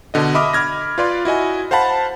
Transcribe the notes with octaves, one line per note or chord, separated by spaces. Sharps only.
B2 D3 D#5
D#5 E5 B5 D6 D#6 F6
B5 D6 F6 G#6 A#6
F4 B4 D5 F5 C6
E4 F#4 D#5 G#5
C5 F5 F#5 A5 B5